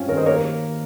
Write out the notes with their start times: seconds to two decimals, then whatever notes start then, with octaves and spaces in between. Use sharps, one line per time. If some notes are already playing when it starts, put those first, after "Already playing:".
Already playing: C4 C#4 F4
0.08 D#3 A#4 C#5
0.17 C5 D#5
0.26 A#3 A#4 C#5